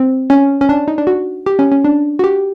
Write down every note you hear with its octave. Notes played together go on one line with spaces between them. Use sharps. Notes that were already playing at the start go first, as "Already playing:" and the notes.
Already playing: C4
C#4
C#4
D4
D#4
D4
F#4
G4
C#4
C#4
D4
F#4
G4